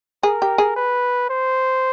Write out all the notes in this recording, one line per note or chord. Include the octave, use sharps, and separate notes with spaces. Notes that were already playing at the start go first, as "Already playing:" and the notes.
G#4 A#4
G4
G#4
B4
C5